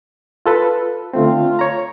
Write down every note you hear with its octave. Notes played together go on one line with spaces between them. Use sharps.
F4 A4 B4
D3 A3 C4 F4
C#5 A#5